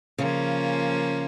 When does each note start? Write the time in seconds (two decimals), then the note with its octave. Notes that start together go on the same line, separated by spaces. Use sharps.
0.18 C#3 F3 A#3 C#4 F4